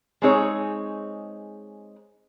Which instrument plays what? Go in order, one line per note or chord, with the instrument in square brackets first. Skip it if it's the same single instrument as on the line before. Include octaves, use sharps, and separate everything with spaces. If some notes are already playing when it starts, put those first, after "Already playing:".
[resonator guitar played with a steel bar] G#3 C4 D#4 G#4 C#5